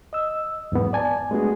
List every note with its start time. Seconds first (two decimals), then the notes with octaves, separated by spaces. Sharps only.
0.13 D#5 E6
0.72 E2 G#2 F#3 B3
0.93 D5 G#5 A5
1.31 G#3 A3 B3 D4 F#4 G#4